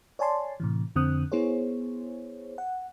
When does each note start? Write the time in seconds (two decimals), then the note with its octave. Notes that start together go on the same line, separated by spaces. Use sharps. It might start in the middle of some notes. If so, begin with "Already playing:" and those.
0.19 C#5 D5 G#5 A5 C6
0.60 A2 C3 E3
0.96 F2 D3 C4 D#6 F#6
1.32 B3 E4 G#4 C5 C#5
2.58 F#5